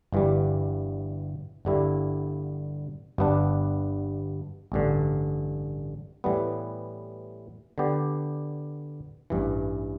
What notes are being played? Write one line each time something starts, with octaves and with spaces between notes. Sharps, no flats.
G1 G2 E3 G3
G1 G2 D3 G3 E4
G1 G2 G3 B3 D4
A1 G2 D3
A2 E3 G3 B3
D3 B3 G4 D5
A1 G2 E3